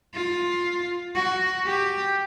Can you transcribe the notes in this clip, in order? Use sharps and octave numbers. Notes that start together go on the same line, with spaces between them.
F4
F#4
G4